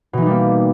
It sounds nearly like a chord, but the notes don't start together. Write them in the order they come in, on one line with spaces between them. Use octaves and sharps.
B2 E3 D#4 G3 A#3